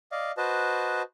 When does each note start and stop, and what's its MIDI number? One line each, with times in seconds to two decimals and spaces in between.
0.12 0.32 74
0.12 0.32 75
0.12 0.32 77
0.37 1.02 66
0.37 1.02 71
0.37 1.02 72
0.37 1.02 75
0.37 1.02 81